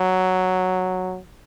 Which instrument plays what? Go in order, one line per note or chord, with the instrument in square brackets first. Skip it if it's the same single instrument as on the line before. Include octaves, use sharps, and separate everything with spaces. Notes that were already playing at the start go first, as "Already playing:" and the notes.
Already playing: [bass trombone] F#3